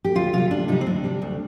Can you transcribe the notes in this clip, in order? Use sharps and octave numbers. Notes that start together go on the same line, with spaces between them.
G4
D2 F4
C3 G3 F4
D2 D4
C3 G3 D#4
C4
D2 D4
C3 G3
D2